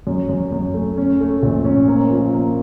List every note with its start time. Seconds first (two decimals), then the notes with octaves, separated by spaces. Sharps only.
0.07 F#2
0.29 F#2
0.52 F#2
0.74 A3
0.97 C#4
1.20 A3
1.43 A#1
1.65 C#4
1.88 A#3
2.10 F3
2.33 A#3